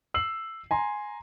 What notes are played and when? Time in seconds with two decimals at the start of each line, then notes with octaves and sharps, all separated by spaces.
0.14 E6 C7 F#7
0.71 G#5 A#5 C6